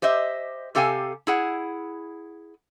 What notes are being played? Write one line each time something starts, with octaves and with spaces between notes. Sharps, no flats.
G4 C5 D#5 E5
C3 G4 A4 F5 G5 G#5
E4 G#4 F#5